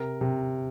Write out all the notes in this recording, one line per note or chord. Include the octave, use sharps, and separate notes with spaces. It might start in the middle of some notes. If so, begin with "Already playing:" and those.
Already playing: C3 A#4
C3